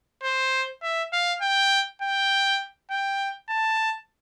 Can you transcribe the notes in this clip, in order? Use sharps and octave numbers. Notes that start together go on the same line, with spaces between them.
C5
E5
F5
G5
G5
G5
A5